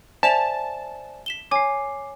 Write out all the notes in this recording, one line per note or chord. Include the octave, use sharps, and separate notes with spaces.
C5 D5 E5 G#5 A5 E7 F7
B6 E7 G7
C#5 G#5 D6 C7